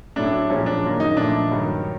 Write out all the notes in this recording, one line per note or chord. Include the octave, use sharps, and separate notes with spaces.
A2 F#3 A3 D4
A#2 F3 G#3 C#4
D4
F#2 D#3 F#3 A#3
D#4
A#2 F3 A3 D4
G2 D#3 F#3